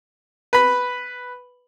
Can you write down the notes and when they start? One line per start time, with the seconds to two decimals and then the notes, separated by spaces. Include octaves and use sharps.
0.53 B4 B5